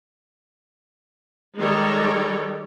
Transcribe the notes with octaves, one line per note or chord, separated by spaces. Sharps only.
D#3 G3 G#3 A4 A#4 C#5